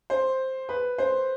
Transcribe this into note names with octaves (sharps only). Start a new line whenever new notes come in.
C5
B4
C5